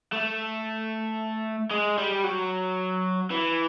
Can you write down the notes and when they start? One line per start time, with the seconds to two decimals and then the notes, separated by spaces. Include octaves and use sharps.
0.13 A3
1.70 G#3
1.98 G3
2.24 F#3
3.30 E3